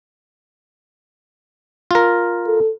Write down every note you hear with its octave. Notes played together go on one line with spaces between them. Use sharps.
F4 A#4
A4